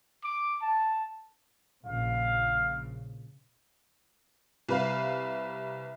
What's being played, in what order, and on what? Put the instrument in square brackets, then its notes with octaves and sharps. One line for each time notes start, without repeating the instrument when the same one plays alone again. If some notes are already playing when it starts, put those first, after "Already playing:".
[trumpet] D6
A5
[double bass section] A#1 C#3 [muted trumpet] F5
[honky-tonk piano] C2 B4 F5